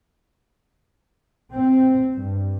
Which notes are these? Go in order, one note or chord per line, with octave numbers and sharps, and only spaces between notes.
C4
G2